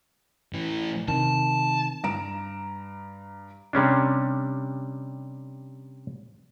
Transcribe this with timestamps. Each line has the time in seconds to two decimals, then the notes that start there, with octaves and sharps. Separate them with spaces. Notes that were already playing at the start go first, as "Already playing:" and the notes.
0.53 A2 E3
1.08 C3 D#3 A5
2.04 G2 A#5 D7 E7
3.73 C3 G3 C#4 D4